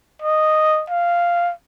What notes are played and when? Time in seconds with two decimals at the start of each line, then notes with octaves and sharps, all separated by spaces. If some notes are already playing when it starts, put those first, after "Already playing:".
0.22 D#5
0.90 F5